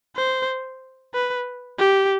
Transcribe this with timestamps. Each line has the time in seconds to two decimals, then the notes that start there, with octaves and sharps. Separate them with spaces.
0.16 C5
1.14 B4
1.79 G4